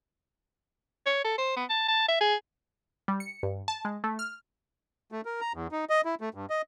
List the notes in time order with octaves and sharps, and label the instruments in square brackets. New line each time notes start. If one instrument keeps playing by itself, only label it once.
[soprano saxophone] C#5
A4
C5
B3
A5
A5
E5
G#4
[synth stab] G3
C#7
G2
A5
G#3
A3
F6
[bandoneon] A3
A#4
A#5
E2
D#4
D#5
E4
A3
G2
D#5